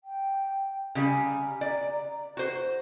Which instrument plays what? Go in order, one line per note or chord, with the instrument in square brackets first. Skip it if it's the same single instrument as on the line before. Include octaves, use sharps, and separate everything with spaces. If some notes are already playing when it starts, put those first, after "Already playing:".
[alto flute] G5
[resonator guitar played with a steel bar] C#3 G3 G#5 [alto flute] A#5
[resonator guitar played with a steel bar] D5
F#4 C5